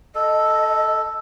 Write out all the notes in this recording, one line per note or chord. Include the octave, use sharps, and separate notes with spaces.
A4 D#5